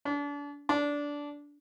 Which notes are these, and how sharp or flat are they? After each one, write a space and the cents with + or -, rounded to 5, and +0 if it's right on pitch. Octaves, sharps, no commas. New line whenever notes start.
D4 -35
D4 -15